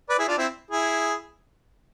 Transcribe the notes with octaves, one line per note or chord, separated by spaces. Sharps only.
B4 D5
E4 G#4
D4 F4
C4 E4
E4 G#4